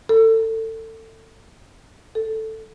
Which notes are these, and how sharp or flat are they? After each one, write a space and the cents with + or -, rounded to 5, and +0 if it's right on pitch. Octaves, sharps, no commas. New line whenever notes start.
A4 +25
A4 +5